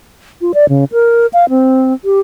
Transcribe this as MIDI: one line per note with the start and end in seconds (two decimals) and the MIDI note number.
0.41 0.52 65
0.54 0.68 74
0.69 0.85 49
0.92 1.26 70
1.33 1.45 77
1.49 1.93 60
2.05 2.20 67